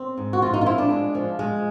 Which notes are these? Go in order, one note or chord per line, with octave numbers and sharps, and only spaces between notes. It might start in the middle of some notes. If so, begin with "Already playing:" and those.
Already playing: C4
G#2
F#4
F3 F4
D#4
F4
C4 E4
D4
G#3
F3
G#3